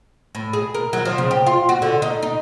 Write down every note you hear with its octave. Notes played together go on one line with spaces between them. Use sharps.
A2
G#4
A#4
F#3
F3
C#3
G4
F4
F#4
D3
D#4
D#4